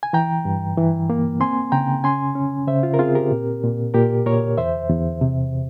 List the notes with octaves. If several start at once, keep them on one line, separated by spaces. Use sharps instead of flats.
G#5
E3 G5 A#5
G2
E3
A#3
C4 G#5 C6
C#3 G5 A#5
C#4 G#5 C6
C#4
C#3 C5 E5
F4
A#4
C4 F4 G#4
G4 A#4
A#2
A#2
A#2 G4 A#4
A#2 A#4 C#5
E2 C5 E5
E2
C3